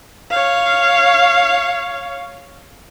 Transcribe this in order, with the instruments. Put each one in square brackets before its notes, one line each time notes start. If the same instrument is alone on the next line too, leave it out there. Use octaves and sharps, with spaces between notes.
[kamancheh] C#5 F5